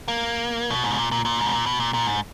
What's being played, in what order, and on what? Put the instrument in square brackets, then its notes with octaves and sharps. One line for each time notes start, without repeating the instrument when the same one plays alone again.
[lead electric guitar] A#3
B2
G#2
B2
A#2
A#2
A#2
G#2
B2
A#2
B2
A#2
A#2
G#2